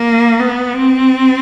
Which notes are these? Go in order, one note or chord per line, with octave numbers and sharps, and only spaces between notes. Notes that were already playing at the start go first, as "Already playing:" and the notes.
Already playing: A#3
B3
C4